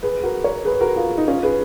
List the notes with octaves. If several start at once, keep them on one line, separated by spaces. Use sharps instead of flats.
G#4 B4
F#4 A#4
A#4 C#5
G#4 B4
F#4 A#4
F4 G#4
D#4
C#4 F4
G#4 B4